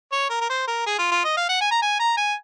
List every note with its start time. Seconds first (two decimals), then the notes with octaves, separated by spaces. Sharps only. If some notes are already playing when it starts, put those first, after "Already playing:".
0.12 C#5
0.30 A#4
0.41 A#4
0.50 C5
0.68 A#4
0.86 G#4
0.99 F4
1.12 F4
1.25 D#5
1.37 F5
1.49 F#5
1.61 G#5
1.71 A#5
1.82 G#5
2.00 A#5
2.17 G#5